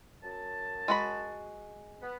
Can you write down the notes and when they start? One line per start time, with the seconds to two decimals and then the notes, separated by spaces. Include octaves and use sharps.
0.23 F#2 A5
0.88 G#3 F#4 B5
2.02 B3